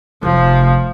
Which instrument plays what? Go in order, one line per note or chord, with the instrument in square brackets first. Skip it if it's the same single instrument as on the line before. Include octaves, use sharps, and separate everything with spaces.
[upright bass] F1 [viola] F3